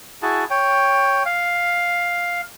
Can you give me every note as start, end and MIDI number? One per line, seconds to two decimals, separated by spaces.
0.22 0.44 64
0.22 0.44 66
0.22 0.44 68
0.22 0.44 81
0.50 1.23 73
0.50 1.23 79
1.26 2.41 77